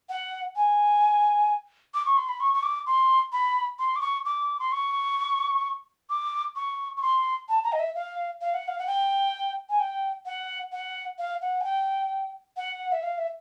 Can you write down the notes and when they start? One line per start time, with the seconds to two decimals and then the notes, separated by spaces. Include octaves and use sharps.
0.09 F#5
0.56 G#5
1.94 D6
2.06 C#6
2.17 C6
2.29 B5
2.40 C#6
2.54 C#6
2.63 D6
2.87 C6
3.32 B5
3.79 C6
3.96 D6
4.01 C#6
4.25 D6
4.60 C6
4.72 C#6
6.10 D6
6.56 C#6
6.97 C#6
7.02 C6
7.49 A5
7.64 A#5
7.72 D#5
7.79 E5
7.95 F5
8.41 F5
8.54 F#5
8.68 F5
8.79 F#5
8.87 G5
9.69 G#5
9.80 G5
10.26 F#5
10.72 F#5
11.19 F5
11.42 F#5
11.61 G#5
11.64 G5
12.57 F#5
12.92 E5
13.03 F5
13.18 E5